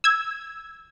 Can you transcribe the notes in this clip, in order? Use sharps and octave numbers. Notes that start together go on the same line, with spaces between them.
E6 G#6